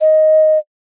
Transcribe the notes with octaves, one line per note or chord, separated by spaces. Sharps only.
D#5